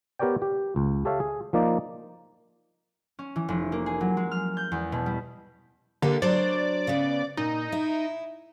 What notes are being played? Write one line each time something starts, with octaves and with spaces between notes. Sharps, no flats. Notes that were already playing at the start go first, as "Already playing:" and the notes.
B3 G4 A#4 C#5 D5 G5
G4
C#2
G4 A4 C#5 E5 F5
G#4
F3 A#3 D#4 D5
C#4
E3
F1
A#3
G#4
F#3
G#3
F6
G6
E2
B2
G3
D3 A#3 G4 A4
F#3 D4 C5 D5
C#3 B3
A#2 D#4
E4